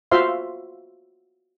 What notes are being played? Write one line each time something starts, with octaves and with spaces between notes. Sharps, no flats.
F4 F#4 C5 E5 F5 C6